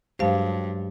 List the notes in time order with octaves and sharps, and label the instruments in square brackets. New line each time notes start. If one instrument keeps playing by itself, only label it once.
[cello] G2 [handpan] F#3 G#3 G4 [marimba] C5 F5 A5